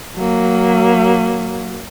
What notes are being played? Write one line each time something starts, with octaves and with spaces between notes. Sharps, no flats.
F#3 A#3